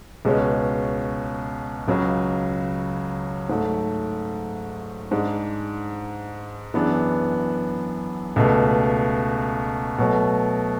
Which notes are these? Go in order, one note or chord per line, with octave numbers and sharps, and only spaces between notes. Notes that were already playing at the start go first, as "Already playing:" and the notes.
C#2 B2 G#3 C#4
C#2 C#3 F#3
G#2 F#3 A3
G#2 G#3 D4
F#2 E3 B3 D4 G#4
C#2 B2 A3
B2 F#3 A3